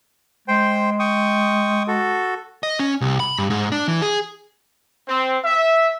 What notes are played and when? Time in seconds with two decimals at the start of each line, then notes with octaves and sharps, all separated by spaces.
0.48 G#3 C5 G5
0.99 G5 C#6 D#6
1.88 F#4 A4
2.63 D#5
2.79 C#4
3.01 C2
3.20 B5
3.38 G2
3.50 G#2
3.72 D4
3.88 E3
4.02 G#4
5.08 C4
5.44 E5